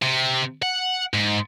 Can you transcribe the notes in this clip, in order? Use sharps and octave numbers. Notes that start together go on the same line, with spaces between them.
C3
F#5
G#2